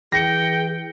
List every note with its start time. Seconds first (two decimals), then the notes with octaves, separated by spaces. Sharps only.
0.12 E3 G#4 G5 A#6 C#7